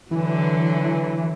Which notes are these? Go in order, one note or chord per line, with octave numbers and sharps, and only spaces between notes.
D3 E3 F#3